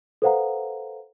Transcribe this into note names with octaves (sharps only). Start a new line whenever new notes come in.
A4 B4 C5 F5 F#5 A#5